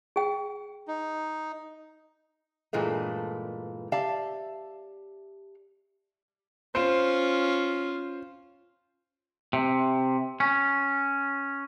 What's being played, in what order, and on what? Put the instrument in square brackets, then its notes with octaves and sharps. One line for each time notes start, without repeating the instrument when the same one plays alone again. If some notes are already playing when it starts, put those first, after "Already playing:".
[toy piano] G#4 G5
[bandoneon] D#4
[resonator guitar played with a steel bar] G2 A#2 E3 G#3 A3
G4 D5 E5 F5 A5
[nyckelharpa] C#4 F4 [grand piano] C5
[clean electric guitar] C3
C#4